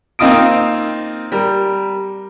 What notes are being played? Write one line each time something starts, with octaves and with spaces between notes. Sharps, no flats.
A#3 C4 D#4 F4 D#6 D7
G3 A#4